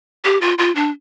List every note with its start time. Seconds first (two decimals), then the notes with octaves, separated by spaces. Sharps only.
0.25 G4
0.41 F4
0.58 F4
0.75 D4